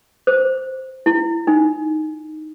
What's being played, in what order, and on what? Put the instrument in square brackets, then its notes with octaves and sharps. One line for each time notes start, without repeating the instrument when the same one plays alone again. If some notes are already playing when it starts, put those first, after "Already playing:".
[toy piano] C5
E4
D#4